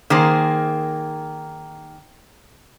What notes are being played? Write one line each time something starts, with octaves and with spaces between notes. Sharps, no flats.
D#3 A#3 G#4 C5